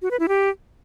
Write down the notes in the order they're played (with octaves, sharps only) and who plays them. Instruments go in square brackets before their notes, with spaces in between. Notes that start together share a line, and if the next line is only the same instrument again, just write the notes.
[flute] F#4
B4
E4
G4